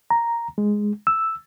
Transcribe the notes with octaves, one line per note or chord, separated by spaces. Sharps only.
A#5
G#3
E6